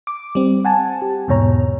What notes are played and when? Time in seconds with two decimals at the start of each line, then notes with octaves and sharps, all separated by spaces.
0.07 D6
0.35 G3 C4
0.65 F#5 G#5 A5
1.02 G4
1.28 E2 G#2 B2 C#5 A#5